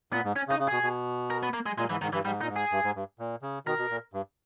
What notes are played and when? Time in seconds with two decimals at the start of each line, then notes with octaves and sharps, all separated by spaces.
0.12 A#2 B3
0.24 G#2
0.36 C#4
0.48 C#3
0.51 D#4
0.59 C#3
0.68 B2 G#4
0.83 B2
1.30 A#4
1.43 B3
1.53 A#3
1.66 G#3
1.78 A#2 G#3
1.89 G#2 E3
2.01 G#2 D#3
2.13 G2 E3
2.25 G#2 G3
2.41 A#2 D#4
2.48 G#2
2.56 G#4
2.72 G2
2.84 G#2
2.96 G2
3.19 A#2
3.42 C#3
3.66 B2 D#3 A#4
3.78 B2
3.90 A#2
4.13 G2